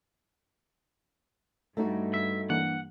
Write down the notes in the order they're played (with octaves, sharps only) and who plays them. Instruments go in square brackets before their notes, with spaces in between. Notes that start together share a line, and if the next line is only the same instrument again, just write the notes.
[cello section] G2 [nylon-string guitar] A3 D#4 F#4
[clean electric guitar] E5
[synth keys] E3 A#3 D4 [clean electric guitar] F#5